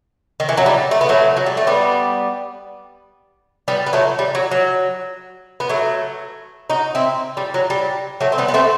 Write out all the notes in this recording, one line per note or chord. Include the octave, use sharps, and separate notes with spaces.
D#3
E3
F#3
G3
A3
B3
F#3 A3
F#3
G3
A3
G3 B3
G3 B3
B3
F#3 A3
G3
F#3
F#3
B3
F#3 A3
D#4 F#4
C4 E4
G3
F#3
G3
F#3 A3
C4
G3 B3
B3
A3 C4